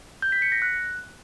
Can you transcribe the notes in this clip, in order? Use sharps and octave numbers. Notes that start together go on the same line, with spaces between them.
G6
B6
C#7
A#6
F#6